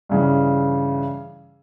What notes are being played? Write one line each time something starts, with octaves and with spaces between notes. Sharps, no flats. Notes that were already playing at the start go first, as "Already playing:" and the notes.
G2 C#3 E3